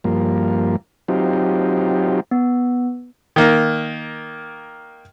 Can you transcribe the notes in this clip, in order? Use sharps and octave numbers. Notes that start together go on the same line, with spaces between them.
G2 F3 A#3
F#3 C4 D#4 F4 G4
B3
D#3 A#3